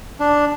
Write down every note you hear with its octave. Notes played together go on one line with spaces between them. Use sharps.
D4